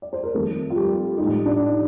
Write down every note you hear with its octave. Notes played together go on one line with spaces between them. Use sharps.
D5
C5
A#4
F2 D#3 G3 A3 A4
F4
G3 G4
G3 D#4
A2
D4